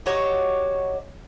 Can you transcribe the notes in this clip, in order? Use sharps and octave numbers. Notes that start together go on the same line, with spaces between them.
D#4 F#4 G4 C#5